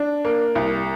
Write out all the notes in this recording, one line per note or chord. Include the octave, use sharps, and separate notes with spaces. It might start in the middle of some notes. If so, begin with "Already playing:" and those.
Already playing: D4
A#3
C2